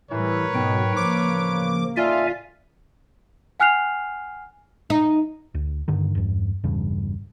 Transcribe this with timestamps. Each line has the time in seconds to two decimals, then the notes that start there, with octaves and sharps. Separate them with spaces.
0.11 A2 E3 G3 A#4 B4 C#5
0.55 G#2 B2 F#3 G5
0.96 A1 C#3 F3 A#3 D6
1.97 D#4 F4 A4 D5 E5 F5 G#5
3.60 F#5 G#5 F6 F#6 C7 F7
4.90 D#4
5.54 D2
5.88 G2 D3 D#3
6.15 E2 G2
6.64 A1 E2 G2 C#3